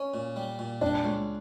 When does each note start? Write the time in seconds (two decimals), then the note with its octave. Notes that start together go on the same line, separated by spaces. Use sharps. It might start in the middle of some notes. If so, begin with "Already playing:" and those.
Already playing: C#4
0.14 A#2
0.36 G3
0.59 A#2
0.81 G3 D4
1.04 C#2